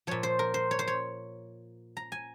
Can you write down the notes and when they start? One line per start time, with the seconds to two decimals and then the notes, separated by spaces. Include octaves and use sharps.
0.07 A#2 F3 C#5
0.23 C5
0.39 A#4
0.54 C5
0.71 C#5
0.79 C5
0.88 C#5
1.97 A#5
2.12 G#5